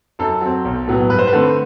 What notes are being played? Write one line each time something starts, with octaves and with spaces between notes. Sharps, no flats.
F#2 A4
F#3 C4
B1
A2 F#3 B3
G2 B4
C5
B4
D3 A3 C4